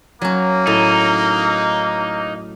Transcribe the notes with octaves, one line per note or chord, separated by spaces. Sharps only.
F#3 A#3 C#4
A2 D#4